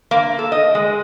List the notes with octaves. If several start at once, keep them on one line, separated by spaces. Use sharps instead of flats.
A#3
A4
D#5
G#3